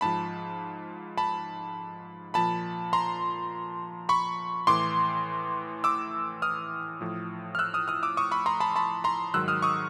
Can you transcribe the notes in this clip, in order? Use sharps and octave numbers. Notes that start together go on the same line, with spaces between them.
G#2 F3 A5 B5
A5 B5
A#2 F3 A5 B5
A#5 C6
B5 C#6
A2 E3 C6 D6
D6 E6
D#6 F6
A2 F3
F6
E6 F#6
D#6 F6
D#6 F6
D6 E6
C#6 D#6
B5 C#6
A#5 C6
A5 B5
A5 B5
A#5 C6
G#2 D#3 F#3 E6 F#6
D#6 F6
C#6 D#6